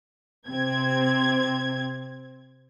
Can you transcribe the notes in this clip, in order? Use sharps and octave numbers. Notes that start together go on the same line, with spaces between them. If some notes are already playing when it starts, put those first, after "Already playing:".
C3 C4 G#6